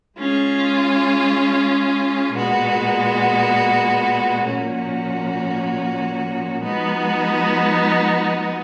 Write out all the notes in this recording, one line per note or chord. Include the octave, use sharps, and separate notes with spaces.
G#3 C#4 F4 G#4
A#2 G#3 B3 F#4
A#2 F3 A#3 C#4 F#4
F3 G#3 B3 D#4 F#4